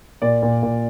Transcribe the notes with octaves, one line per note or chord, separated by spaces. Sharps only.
A#2 D5
A#2
A#2